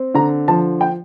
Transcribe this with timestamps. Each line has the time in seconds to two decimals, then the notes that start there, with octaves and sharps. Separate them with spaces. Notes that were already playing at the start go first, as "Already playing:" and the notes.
Already playing: C4
0.14 D3 A#5
0.48 F3 A5
0.81 G5